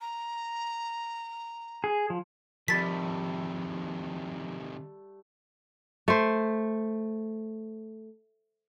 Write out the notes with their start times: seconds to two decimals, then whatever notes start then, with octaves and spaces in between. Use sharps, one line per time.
0.01 A#5
1.84 G#4
2.10 F3
2.68 C3 D#3 F3 G3 A3 A6 B6
6.08 A3 C5